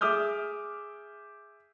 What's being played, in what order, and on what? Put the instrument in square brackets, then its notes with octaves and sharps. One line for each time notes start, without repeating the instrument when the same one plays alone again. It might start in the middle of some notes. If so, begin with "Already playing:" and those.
[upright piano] G#4 E5 D6 D#6 F6 G6